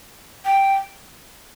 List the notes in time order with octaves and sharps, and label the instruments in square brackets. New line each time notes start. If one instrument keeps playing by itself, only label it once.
[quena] G5